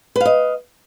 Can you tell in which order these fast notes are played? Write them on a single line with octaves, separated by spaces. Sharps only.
B4 F5 D#5